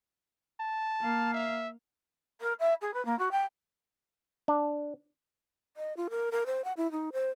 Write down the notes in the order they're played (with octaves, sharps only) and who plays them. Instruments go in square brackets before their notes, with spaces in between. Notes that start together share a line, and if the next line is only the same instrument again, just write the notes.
[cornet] A5
[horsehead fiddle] A#3 F5
[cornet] E5
[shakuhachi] A#4
E5
G#4
B4
A#3
F#4
G5
[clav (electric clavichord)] D4
[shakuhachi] D#5
F4
A#4
A#4
C5
F#5
E4
D#4
C5